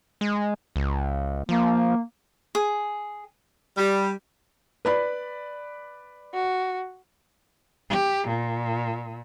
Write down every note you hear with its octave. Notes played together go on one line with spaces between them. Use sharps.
G#3
C#2
F3 A#3
G#4
G3
B4 D5 B5
F#4
G4
A#2